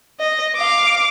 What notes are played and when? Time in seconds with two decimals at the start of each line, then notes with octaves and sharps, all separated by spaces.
0.20 D#5
0.57 F5 D6